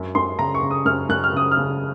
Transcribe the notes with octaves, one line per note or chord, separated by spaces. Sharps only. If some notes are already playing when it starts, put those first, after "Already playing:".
Already playing: F#2
F#2 C6
C#3 A#5
C#6
C#3
D#6
F#2 F6
F#2 F#6
F6
C#3 D#6
F6
C#3